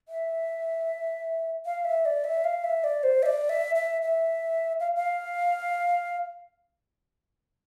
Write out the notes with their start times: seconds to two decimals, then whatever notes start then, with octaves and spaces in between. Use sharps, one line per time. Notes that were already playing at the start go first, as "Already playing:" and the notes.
0.09 E5
1.66 F5
1.85 E5
2.05 D5
2.24 E5
2.44 F5
2.64 E5
2.84 D5
3.03 C5
3.23 E5
3.26 D5
3.49 E5
3.75 E5
4.02 E5
4.80 F5
4.96 F5